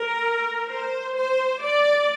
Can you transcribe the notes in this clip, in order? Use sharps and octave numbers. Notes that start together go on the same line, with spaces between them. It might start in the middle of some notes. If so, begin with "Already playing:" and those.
Already playing: A#4
C5
C5
D5